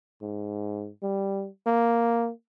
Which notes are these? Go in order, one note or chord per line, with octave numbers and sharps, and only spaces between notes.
G#2
G3
A#3